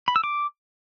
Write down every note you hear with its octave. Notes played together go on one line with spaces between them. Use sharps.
B5
E6
D6